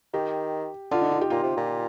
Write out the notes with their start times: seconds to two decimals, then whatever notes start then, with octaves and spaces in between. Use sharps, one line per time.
0.13 D#3 G4
0.91 D3 F4
1.01 D#4
1.12 F4
1.21 G4
1.30 A#2 F4
1.43 C3
1.57 A#2